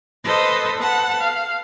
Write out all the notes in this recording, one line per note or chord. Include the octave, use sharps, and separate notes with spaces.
A4 B4 C5 D#5 D#6
B4 F#5 A5
F5